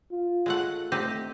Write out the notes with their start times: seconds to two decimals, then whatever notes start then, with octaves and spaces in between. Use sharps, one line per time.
0.11 F4
0.46 G#3 A3 F#5
0.92 A3 C4 D#4 G4